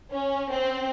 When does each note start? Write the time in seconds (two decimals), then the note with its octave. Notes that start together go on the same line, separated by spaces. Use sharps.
0.11 C#4
0.51 C4